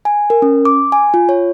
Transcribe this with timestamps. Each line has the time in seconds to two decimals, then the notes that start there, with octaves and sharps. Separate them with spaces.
0.05 G#5
0.30 A#4
0.42 C#4
0.65 D6
0.92 G#5
1.14 F4
1.29 C#5